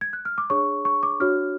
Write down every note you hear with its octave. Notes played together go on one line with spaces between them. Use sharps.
G#6
F#6
F6
D6
D4 G#4 C#5 C#6
C#6
D6
D4 F#4 C#5 F6